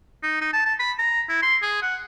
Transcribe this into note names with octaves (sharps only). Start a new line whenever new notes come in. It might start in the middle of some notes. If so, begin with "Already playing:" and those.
D#4
D#4
A5
A5
B5
A#5
E4
C6
G#4
F#5